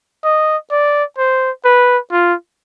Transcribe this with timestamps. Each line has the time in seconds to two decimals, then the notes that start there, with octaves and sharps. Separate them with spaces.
0.24 D#5
0.71 D5
1.18 C5
1.65 B4
2.12 F4